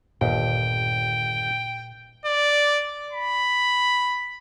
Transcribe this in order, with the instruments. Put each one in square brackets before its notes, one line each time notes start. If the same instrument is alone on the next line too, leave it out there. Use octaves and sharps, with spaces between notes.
[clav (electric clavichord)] G1 D#2 [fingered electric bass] A#2 [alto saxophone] G5
[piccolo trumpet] D5
B5